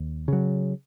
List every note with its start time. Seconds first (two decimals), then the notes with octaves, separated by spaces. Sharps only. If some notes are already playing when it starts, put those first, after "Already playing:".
Already playing: D#2
0.28 C#3 F#3